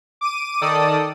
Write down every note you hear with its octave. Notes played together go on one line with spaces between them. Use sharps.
D6 D#7
D#3 A4 D5 D#6